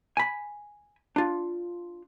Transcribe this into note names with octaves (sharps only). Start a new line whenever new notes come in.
G#5 B5
D4 F4